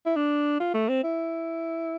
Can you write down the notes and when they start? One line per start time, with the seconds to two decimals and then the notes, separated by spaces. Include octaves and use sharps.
0.06 E4
0.16 D4
0.60 F4
0.74 A3
0.89 C4
1.03 E4